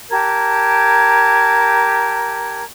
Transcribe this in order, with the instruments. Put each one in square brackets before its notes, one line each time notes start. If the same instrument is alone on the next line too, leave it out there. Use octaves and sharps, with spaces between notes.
[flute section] G4 A#4 A5 G#6